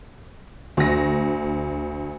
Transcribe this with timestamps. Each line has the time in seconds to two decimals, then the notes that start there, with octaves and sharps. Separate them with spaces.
0.77 D2 A#6